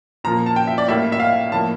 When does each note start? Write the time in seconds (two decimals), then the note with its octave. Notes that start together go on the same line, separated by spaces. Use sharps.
0.24 A#2 F3 A#3 A#5
0.46 A5
0.56 G5
0.67 E5
0.78 D5
0.88 A2 G3 A#3 E5
1.12 E5
1.20 F5
1.52 A2 F3 A#3 A5